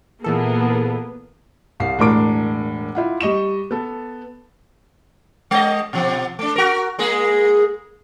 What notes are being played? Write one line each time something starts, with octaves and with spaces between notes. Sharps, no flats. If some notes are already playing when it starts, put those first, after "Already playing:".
A#2 E3 A#3 B3 G#4 A4
C2 F5 C7
E1 A2 D4 A#4 D6 D7
E4 F4 F#5
G3 D#5 C#6 E7
B3 A4
G#3 D#5
B2 F3
A3 D4
F#4 A#4
G#3 A#3 G#4